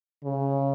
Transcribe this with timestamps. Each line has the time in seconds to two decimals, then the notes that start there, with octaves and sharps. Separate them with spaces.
0.24 C#3